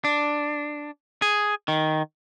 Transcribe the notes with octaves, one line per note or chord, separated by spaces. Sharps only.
D4
G#4
D#3